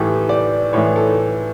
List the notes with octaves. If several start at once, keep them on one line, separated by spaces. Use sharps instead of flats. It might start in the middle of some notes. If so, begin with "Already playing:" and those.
Already playing: A2 E3 G4 A4
D5
A2 E3 C#5
A4